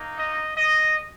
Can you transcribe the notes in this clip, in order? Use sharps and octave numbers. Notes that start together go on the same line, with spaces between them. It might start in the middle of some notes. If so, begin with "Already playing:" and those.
Already playing: A#3 D#4
D#5
D#5